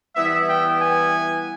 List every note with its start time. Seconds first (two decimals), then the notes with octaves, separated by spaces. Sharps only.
0.15 E3 G3 B3 E4 E5
0.48 G5
0.81 G#5